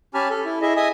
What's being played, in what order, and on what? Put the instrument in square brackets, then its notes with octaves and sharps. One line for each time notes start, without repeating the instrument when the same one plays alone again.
[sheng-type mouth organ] C#4 G4 G#5 A5 B5 F6
A4
E4
E4 G#4 D#5 E5
D#5 E5 G#5 D#6